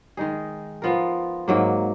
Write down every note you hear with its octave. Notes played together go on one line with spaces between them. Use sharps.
D#3 G#3 D#4 G#4
F3 B3 F4 A#4
G#2 F#3 A#3